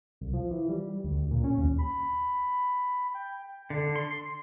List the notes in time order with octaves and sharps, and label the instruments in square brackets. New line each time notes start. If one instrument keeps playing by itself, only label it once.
[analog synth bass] C2
F3
E3
G3
D2
A#2
C#4
D#2
[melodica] B5
G5
[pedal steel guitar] D3
C6